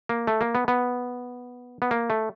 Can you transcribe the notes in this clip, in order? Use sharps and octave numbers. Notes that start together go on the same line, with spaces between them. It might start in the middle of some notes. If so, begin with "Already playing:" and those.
A#3
A3
A#3
B3
B3
B3
A#3
A3